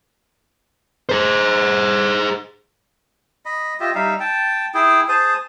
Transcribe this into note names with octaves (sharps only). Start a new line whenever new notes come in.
G#4 C5
D#5 B5
F4 G4 D#5 E5
G3 D#4 E5 F5
G5 A5
E4 G#4 G5
G#4 C5 A5 D#6